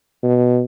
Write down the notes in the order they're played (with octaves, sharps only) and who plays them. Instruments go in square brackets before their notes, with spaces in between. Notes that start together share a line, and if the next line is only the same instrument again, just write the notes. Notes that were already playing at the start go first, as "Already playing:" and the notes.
[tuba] B2